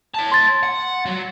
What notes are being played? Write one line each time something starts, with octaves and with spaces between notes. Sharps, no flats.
C#5 A5
C6 A6
F#5
F#3